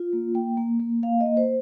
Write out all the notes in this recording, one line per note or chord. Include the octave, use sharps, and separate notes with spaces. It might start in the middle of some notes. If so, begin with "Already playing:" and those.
Already playing: F4
A#3
A#3 G5
A#3
A#3
A#3 F5
D#5
A#3
C5